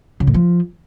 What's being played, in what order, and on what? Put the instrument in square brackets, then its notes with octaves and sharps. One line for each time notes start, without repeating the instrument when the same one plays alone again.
[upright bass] C#3
A2
F3